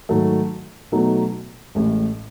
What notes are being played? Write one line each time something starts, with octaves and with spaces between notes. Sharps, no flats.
G#2 D#3 F#3 A3
B2 F#3 A3 D#4
A1 A2 G#3